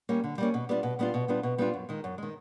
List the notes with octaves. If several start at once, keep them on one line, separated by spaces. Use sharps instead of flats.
G3 A#3 C#4
D3
G3 A#3 C#4
B2
G3 B3 D4 F4
B2
G3 B3 D4 F4
B2
G3 B3 D4 F4
B2
G3 B3 D4 F4
F#2
D#3 G#3
F#2
D#3 G#3